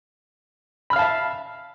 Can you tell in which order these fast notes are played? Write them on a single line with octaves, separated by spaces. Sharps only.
B5 F6 F5 A5 E5